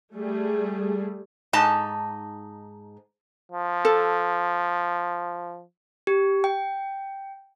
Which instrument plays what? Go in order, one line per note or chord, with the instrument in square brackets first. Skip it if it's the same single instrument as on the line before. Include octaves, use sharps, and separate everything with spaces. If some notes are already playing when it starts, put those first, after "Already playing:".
[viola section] G3 A3 G#4
[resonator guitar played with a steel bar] G#2 D#4 A5
[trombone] F3
[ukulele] A4
[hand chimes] G4
G5